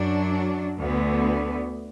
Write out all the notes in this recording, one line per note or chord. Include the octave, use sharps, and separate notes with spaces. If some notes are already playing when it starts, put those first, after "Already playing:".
Already playing: F#2 F#3 D4
D2 D3 B3